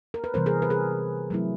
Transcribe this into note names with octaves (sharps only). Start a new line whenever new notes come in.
A#4
B4
C3 E3 G3 B3 A#4 C5
G#4 A#4
B4
G#4 A#4
F#3 A3 C4 E4